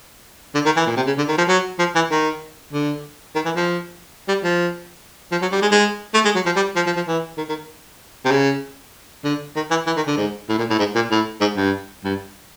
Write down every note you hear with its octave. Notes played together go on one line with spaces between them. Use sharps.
D3
D#3
E3
A#2
C3
C#3
D3
D#3
F3
F#3
F3
E3
D#3
D3
D#3
E3
F3
G3
F3
F3
F#3
G3
G#3
G#3
A3
G#3
F#3
F3
G3
F3
F3
F3
E3
D#3
D#3
C3
C#3
D3
D#3
E3
E3
D#3
D3
G#2
A2
A#2
A2
G#2
A#2
A2
G#2
G2
G2